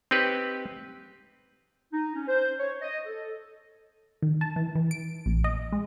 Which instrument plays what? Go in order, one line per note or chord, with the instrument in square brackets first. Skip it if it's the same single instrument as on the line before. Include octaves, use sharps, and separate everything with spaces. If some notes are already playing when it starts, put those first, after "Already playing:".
[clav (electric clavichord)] C4 D#4 G4 B4 C#5
[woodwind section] D#4
C#4
C5
C#5
D#5
A4
[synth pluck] D#3
A5
E3
E3
D7
A#1
D#5
G#3